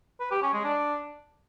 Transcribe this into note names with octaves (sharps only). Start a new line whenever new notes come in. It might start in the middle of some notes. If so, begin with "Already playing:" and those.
B4
G4
C#4
G#3
D4